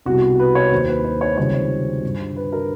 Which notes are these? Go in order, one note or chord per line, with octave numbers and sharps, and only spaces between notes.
C2 B2 G3 F#4
F#4
B4
C#5
D#2 D#3 F#3 C5
B4
C5
C#5
C#2 C3 D#3 G3 C#5
C5
G2 D3 G3
B4
A#4